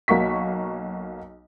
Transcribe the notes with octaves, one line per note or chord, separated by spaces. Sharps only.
B1 A#3 F#4 C#6 B6